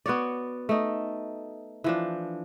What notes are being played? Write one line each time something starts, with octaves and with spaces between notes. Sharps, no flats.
B3 F#4 C#5 D5
A3 D#4
E3 F3 D4